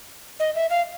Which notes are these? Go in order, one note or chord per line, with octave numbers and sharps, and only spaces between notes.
D#5
E5
F5